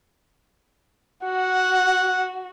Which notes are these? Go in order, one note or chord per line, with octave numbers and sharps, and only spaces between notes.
F#4 F#5